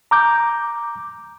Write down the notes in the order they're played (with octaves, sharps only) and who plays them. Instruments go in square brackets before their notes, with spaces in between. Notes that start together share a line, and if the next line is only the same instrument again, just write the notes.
[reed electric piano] A#5 D6 G6